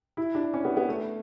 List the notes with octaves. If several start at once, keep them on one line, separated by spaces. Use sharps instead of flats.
E4
D4
C#4
B3
B3
A3